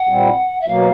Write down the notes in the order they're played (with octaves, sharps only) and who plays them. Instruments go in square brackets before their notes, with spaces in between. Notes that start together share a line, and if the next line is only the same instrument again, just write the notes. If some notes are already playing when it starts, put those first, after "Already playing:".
Already playing: [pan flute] F#5
[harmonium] A#2 G3 C4
[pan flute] E5
[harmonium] B2 F#3 A#3 [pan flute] F5